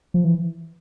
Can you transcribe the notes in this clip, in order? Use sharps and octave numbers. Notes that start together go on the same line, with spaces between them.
F3
E3